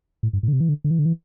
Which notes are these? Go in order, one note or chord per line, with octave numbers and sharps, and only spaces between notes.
A2
G2
A2
D3
C3
E3
D3
D3
E3
D3
E3